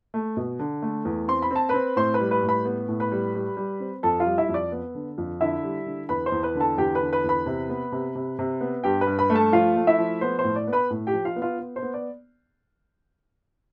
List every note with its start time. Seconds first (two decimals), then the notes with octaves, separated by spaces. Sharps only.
0.14 A3
0.37 B2
0.59 D3
0.82 A3
1.05 E2
1.28 C4 C6
1.42 B5
1.51 C4 A5
1.69 C4 B4 B5
1.96 A2 C5 C6
2.14 B4 B5
2.20 G3
2.31 B4 B5
2.43 A2
2.48 B4 B5
2.66 B3
2.89 A2
3.00 B4 B5
3.12 G3
3.35 G3
3.57 G3
3.80 C4
4.03 F2 A4 A5
4.20 F4 F5
4.25 G3
4.38 E4 E5
4.49 F2
4.54 D5
4.72 B3
4.95 D3
5.18 F2
5.41 D3 E4 E5
5.63 G3
5.86 D3
6.09 E2 B4 B5
6.26 C5 C6
6.32 E2
6.43 B4 B5
6.55 D3
6.61 A4 A5
6.78 E2 G4 G5
6.95 B4 B5
7.01 D3
7.13 B4 B5
7.24 E2
7.29 B4 B5
7.46 C3
7.69 B3
7.92 C3
8.15 C3
8.39 C3
8.61 B3
8.84 G2 G4 G5
9.01 B4 B5
9.07 G2
9.19 B4 B5
9.30 A3
9.35 A4 A5
9.53 F3 F4 F5
9.76 A3
9.87 E4 E5
9.98 F3
10.21 B3 C5
10.39 C5
10.44 A2
10.56 D5
10.67 B3
10.73 B4 B5
10.90 A2
11.07 G4 G5
11.13 F3
11.25 F4 F5
11.36 B3
11.42 F4 F5
11.59 B3
11.76 C5
11.83 B3
11.94 D5